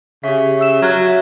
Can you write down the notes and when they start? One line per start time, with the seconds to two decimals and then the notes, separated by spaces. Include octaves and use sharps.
0.24 C#3 G4 E5
0.59 E5 E6 E7
0.82 F#3 A#5 F6 F#6
1.07 E5